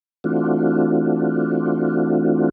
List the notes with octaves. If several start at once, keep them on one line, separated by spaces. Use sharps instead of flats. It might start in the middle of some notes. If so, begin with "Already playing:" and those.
E3 A3 C4 D4 F4 F#4